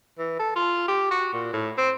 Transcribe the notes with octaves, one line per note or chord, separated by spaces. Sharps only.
E3
A4
F4
G4
F#4
A#2
A2
C4